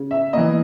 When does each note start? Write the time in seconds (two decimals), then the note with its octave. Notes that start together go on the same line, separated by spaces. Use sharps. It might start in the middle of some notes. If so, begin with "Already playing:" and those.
Already playing: C#3
0.11 E5
0.33 E3 A#3 D#5